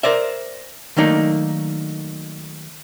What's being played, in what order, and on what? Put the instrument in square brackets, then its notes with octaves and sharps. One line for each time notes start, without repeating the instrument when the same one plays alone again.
[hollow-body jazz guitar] A#4 C5 D5 E5
D#3 F#3 A3 A#3 D4 D#4